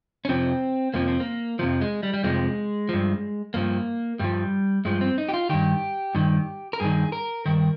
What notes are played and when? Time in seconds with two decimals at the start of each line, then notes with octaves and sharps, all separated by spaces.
0.25 C#4
0.29 F2 C3 F3 C4
0.94 F2 C3 F3 A#3
1.08 C4
1.20 A#3
1.59 F2 C3 F3
1.81 G#3
2.03 G3
2.14 G3
2.24 F2 C3 F3 G#3
2.89 G2 F3
3.54 G2 F3 A#3
4.19 G2 F3 G3
4.85 G2 F3 G#3
5.01 C4
5.18 D#4
5.29 G4
5.34 F4
5.49 G2 D#3 G4
6.15 G2 D#3
6.73 A#4
6.80 G2 D#3 G#4
7.12 A#4
7.46 G2 D#3 A#4